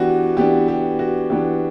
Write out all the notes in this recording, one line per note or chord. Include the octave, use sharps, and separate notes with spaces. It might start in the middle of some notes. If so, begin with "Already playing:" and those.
Already playing: E3 B3 D4 F#4 G4
E3 B3 D4 G4
G4
F#4
E3 B3 D4 G4